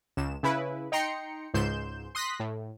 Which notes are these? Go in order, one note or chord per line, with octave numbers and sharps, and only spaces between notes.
C#2 E7
C#3 E4 B4
D#4 G5 A#5 C6 C#7
C#2 G#2 C6 G6 E7
C6 D#6 F#6 A#6 B6
A2